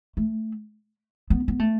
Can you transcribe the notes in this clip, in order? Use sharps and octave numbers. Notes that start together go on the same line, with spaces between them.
A3
B3
B3
A3